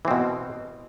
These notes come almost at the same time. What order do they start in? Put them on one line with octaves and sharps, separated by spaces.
E3 C4 B2